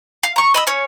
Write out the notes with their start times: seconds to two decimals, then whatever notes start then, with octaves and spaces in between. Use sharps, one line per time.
0.23 F5
0.36 A#5 C#6
0.54 D#5 B5 E6
0.67 C#4 C#5